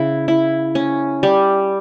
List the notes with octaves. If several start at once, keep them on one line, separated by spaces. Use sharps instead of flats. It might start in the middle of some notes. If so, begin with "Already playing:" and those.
Already playing: C#3 E4
E4
C#4
G3